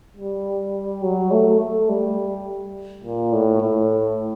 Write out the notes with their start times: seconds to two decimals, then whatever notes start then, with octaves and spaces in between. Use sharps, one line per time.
0.17 G3
1.03 F#3
1.32 A3
1.60 A3
1.89 G3
3.04 A#2
3.33 A2
3.62 A2